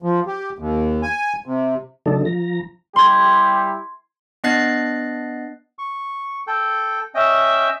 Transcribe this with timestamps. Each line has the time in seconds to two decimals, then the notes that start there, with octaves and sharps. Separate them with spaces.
0.02 F3
0.26 G4
0.59 D#2
1.03 G#5
1.46 C3
2.06 C#3 F#3 A3 D4 D#4 A4
2.25 F3 A#5
2.96 G3 E4 G4 C6 G#6
4.44 B3 D4 D#5 F#6 A6 C7
5.79 C#6
6.47 A4 G5
7.15 C#4 D#5 E5 G5